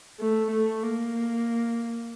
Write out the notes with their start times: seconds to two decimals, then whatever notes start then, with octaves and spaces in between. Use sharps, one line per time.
0.19 A3
0.51 A3
0.83 A#3